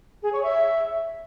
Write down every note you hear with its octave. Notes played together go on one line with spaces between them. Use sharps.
G#4
C#5
E5